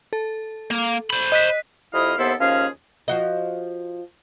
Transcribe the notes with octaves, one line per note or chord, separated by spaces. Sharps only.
A4
A#3
C5 B5
D#5 F#6 B6
F2 C3 E4 D#5 F5 D#6
D#2 C3 B3 E4 A4 C5
D#2 F3 C#4 G#4 F5
F3 F#4 D#5